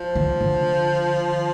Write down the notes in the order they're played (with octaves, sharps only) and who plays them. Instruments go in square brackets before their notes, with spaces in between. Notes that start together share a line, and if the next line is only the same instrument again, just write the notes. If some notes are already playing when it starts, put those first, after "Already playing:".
Already playing: [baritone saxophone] F3
[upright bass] D3
D3